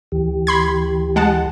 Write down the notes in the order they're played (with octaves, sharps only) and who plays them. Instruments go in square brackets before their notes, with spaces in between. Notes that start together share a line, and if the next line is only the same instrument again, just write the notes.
[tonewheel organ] D2 E3 G4
[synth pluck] B5 C6 G#6
G#3 F#5 A5